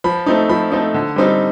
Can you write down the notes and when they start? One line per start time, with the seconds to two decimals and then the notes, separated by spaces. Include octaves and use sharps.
0.04 F3 B5
0.26 A3 C4 D#4
0.49 F3 B5
0.72 A3 C4 D#4
0.94 D3
1.16 G3 C4 D#4